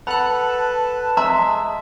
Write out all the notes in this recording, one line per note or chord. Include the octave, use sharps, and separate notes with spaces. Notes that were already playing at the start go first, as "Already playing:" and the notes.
A4 B4 F#5 A5 B5 F#6
G#3 G#4 E5 A#5 C6